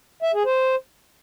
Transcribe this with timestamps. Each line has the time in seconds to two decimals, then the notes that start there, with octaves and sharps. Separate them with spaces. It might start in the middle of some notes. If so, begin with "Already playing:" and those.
0.23 E5
0.34 G#4
0.45 C5